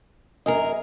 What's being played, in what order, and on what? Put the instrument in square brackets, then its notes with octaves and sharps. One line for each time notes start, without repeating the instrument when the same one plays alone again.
[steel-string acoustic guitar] F#2 G#4 A#4 [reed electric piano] D#5